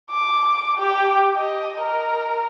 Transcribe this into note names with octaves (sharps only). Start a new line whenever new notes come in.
D6
G4
D#5
A#4